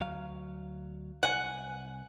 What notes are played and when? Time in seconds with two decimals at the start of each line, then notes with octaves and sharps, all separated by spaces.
0.01 D2 F#3 F5
1.23 C2 F#5 G#5